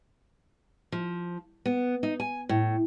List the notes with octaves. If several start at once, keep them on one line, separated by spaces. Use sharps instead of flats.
F3
B3
D#4
G#5
A2